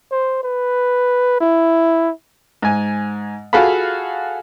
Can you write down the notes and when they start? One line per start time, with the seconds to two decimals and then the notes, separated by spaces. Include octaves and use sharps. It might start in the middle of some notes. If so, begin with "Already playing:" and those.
0.11 C5
0.43 B4
1.41 E4
2.62 G#2 G#5
3.53 F4 F#4 G#4 A4 F5 B5